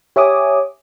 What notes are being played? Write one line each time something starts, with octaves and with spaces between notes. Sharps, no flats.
G4 C#5 E5 G#5 D6 D#6